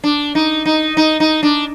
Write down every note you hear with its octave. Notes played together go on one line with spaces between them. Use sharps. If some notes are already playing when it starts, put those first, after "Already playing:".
D4
D#4
D#4
D#4
D#4
D4